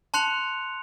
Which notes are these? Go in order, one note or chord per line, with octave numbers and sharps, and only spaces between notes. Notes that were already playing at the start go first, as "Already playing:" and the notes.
A5 C6 F#6 C#7 F7